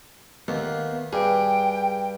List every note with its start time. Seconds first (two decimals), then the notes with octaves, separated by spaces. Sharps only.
0.48 D#2 A3 B3 F5
1.13 G2 G#4 G5